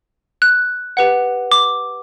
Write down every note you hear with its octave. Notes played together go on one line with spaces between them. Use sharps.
F#6
G4 B4 F#5
D6